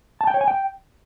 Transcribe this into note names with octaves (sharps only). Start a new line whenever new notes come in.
A5
G5
C#5
G#5
G5